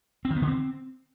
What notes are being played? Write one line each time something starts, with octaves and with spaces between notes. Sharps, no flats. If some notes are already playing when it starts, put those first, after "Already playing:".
C4
D#3
B3
D3
C4